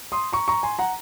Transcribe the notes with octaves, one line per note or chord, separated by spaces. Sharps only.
C6 D#6
A#5 C#6
A#5 C#6
G#5 C6
F#5 A#5